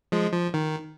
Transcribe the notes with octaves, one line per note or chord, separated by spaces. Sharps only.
F3 G#3
F3
D#3